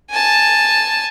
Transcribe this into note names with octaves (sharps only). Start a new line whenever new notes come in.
G#5 A5